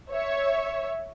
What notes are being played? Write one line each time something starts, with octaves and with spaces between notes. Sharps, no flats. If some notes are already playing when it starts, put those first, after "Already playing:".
C#5 E5